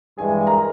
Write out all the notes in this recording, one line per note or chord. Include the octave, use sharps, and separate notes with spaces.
G2 E3 G#3 G#4 G#5
A#4 A#5